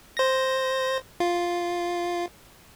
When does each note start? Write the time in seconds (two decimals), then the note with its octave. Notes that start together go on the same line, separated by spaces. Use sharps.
0.17 C5 A#6
1.20 F4